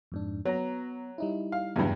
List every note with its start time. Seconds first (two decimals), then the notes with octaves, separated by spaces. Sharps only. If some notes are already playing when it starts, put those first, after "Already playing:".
0.12 F2 G#2 D4
0.45 F#3 B3 A#5
1.18 G3 D#4 E4
1.52 F5
1.76 E2 G2 C#3 F#3 B4